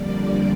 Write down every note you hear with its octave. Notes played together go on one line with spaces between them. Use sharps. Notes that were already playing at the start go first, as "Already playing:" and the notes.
Already playing: F2 D3 G3 A#3 D5